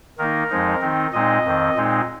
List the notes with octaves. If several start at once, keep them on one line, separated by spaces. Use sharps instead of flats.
D#3 A#3 D#4 A#4
F2 F3 G#3 D#4
D#3 C4 D#4
A#2 G#3 C4 D#4 D#5
F2 D#3 C4
A#2 G#3 C4 D#4